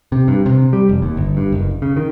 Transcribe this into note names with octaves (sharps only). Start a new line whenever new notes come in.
C3
G2
C3
G3
F1
D#2
G1
G2
F#1
C#3
D#3